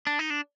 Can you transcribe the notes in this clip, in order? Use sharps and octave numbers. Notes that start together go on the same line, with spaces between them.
D4
D#4
D4